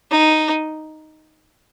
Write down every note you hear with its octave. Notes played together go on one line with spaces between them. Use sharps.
D#4